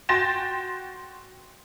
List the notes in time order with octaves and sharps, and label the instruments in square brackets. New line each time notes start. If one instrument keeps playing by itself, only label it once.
[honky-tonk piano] F#4 G5 C6 A6 A#6 E7